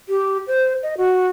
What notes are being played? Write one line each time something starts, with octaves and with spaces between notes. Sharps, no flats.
G4
C5
D#5
F#4